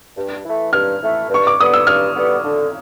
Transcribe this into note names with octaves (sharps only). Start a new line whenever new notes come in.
G2
E3 A3
G2 F6
E3 A3
G2 C#6
D6
D3 G3 B3 D#6
E6
G2 F6
D3 G3 B3
D3